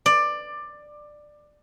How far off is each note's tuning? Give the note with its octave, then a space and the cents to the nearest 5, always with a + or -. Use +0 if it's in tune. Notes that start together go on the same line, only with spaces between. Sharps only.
D5 +15